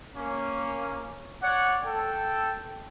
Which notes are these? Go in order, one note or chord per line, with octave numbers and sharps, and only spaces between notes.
A#3 C#4
C#5 D5 F#5
A4 G5